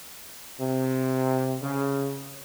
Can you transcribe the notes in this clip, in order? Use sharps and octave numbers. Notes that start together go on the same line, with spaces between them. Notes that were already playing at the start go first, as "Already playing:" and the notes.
C3
C#3